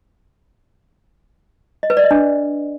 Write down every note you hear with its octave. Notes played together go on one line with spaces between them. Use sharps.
D#5
B4
D5
D#5
D4